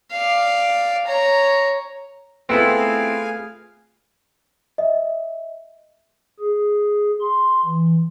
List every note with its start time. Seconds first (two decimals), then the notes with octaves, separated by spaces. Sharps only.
0.12 D5 F5
1.07 C#5 A#5
2.49 A3 B3 C4 E4 F4 G#4 F5 G#5
4.78 D#5 E5
6.39 G#4
7.21 C6
7.66 E3